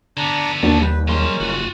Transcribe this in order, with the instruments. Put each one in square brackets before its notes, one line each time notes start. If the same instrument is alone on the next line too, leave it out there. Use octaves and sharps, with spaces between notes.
[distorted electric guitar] D3 B3 [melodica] D4 A#5
[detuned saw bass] D#2 [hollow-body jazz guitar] A#3 D4 F#4 [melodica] A5
[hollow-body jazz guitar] G3 [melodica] B4
[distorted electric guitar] F#3 C6 [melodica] G#3 A#3 C#4
[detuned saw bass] F#1 [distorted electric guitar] F4 F#4